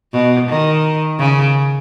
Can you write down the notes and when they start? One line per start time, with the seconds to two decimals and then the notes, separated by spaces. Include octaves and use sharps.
0.13 B2
0.48 D#3
1.19 C#3